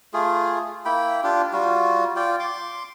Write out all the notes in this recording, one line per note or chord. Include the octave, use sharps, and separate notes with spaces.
A3 F4 G#4
A#3 E4 G5 B5
D4 F4 G4
G3 F4 F#4
F4 D5 G5
C6 D6